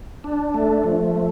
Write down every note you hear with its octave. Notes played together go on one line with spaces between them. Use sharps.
D4
A3
F3
A3